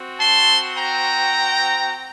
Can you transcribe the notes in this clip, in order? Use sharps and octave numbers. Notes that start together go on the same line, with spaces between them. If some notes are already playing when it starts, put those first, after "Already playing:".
Already playing: C4 F#4
A5 C6
G5 A#5